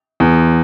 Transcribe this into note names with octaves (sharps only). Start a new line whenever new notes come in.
E2